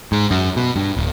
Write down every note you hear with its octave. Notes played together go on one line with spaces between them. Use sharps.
G#2
F#2
B2
G2
D1